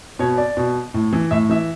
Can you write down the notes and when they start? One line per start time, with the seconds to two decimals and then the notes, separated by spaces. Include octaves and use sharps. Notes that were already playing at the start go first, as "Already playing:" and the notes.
0.19 B2 C#5
0.38 D5
0.57 B2
0.94 A2
1.13 E3
1.31 A2 E5
1.50 E3 E5